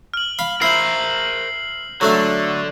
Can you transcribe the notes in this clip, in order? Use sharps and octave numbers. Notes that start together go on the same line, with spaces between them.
F6 F#7
F5 B5
E4 A#4 C5 C7 F#7
D3 F#3 A3 D4